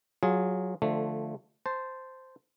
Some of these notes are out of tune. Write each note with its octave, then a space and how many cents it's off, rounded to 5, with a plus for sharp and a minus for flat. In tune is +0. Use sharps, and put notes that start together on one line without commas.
F#3 +0 F4 +20 G#4 +0
D3 +20 F3 +0 A3 +0
C5 -5 A5 +0